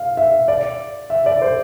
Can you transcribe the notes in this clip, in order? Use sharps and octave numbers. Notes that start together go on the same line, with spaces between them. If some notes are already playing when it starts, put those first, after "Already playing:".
Already playing: F5
E5
D5
E5
D5
C5